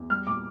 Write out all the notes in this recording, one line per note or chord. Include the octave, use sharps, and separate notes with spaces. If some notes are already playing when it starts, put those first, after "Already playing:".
Already playing: E2
G3 F6
A#2 D6